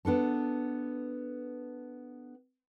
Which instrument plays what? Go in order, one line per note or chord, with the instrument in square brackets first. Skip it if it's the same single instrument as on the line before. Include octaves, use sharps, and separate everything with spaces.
[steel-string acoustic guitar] B3 D4 A4 A5